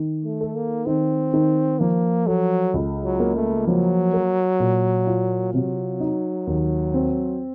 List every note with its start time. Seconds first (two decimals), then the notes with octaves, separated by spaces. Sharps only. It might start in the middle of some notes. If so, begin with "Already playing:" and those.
Already playing: D#3
0.25 A3
0.41 A4
0.55 A#3
0.86 D#3 C4
1.34 D#3
1.80 F3 A#3
2.27 F#3 A4
2.74 C#2
3.05 F#3
3.20 A#3
3.36 A3
3.67 F3 F#3
4.13 A#4
4.60 A#2
5.07 F4
5.54 C3 F#3
6.00 D#4
6.47 D#2
6.94 C4